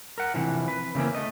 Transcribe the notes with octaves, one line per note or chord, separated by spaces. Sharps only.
A#4 F#5
C3 E3 F3
B4
C#3 E3 A#3 C4 C#4
A3 D#5